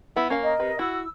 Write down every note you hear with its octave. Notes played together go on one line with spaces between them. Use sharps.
B3 E4
A#3 C#4 F5
A#4 D#5
C3 B4
E4 F#4 E6